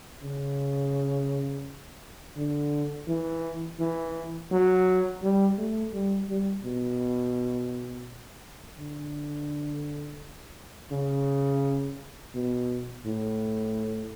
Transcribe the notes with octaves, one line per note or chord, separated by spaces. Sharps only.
C#3
D3
E3
E3
F#3
G3
A3
G3
G3
B2
D3
C#3
B2
A2